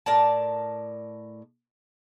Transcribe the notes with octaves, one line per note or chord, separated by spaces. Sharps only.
A2 A#4 D5 A5